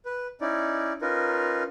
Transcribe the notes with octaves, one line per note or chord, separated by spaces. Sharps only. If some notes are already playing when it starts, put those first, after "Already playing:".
B4
C#4 D#4 E4 D5
C#4 D#4 F4 A#4 B4